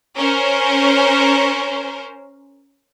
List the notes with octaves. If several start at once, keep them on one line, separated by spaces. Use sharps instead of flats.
C#4 A#4 C5